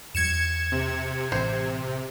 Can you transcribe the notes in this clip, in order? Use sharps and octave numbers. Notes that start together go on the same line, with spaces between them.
E2 F#3 G#6 C#7 E7
C3
A1 C5